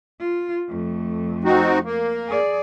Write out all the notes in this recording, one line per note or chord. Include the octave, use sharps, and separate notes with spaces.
F4
F2 A3
C4 D#4 F#4
A#3
G#4 D5